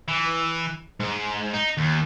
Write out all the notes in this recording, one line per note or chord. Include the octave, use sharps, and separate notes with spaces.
E3
G#2
D#4
D#2